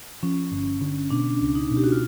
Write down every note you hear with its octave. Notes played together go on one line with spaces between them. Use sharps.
F3 C#4
G1
D3
B2 D4
C#2
D#4
B2
G4
F#4
F4